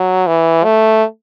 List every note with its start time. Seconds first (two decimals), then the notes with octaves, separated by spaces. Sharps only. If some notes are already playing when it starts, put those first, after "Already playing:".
Already playing: F#3
0.27 E3
0.64 A3